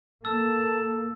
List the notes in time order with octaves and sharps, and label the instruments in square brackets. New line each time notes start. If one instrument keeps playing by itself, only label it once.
[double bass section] A#3 [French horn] A4 [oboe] A5 [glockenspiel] E6